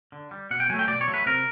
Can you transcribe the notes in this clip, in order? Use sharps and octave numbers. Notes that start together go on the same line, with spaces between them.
D3
G3
B2 F#5
G5
F#3 A3 G#5
G5
B2 D5
C#5
F#3 A3
B4
C3 A#4